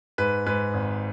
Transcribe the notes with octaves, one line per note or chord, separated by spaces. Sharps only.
G#2 B4
G#2 B4
G#1